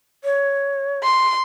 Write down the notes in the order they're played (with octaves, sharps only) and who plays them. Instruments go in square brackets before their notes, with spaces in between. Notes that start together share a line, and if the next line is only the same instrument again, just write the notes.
[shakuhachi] C#5
[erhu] C6